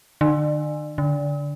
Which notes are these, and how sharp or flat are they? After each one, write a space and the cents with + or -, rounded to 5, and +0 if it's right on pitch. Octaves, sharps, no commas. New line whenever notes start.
D3 +40
D3 -20